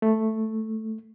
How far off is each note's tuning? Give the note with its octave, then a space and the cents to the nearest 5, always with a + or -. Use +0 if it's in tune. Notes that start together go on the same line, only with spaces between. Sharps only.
A3 +0